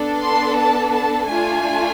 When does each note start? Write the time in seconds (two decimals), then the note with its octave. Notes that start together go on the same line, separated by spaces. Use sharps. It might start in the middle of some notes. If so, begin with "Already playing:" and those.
Already playing: B3 D4 A4
0.21 C6
0.57 A5
0.92 A5
1.28 A3 D4 F4 G#5